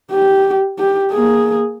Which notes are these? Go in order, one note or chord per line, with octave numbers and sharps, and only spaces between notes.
G4
G4
A#3 G#4